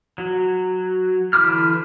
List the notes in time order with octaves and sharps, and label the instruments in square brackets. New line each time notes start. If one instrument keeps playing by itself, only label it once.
[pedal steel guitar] F#3
D3 E3 B5 D6 F6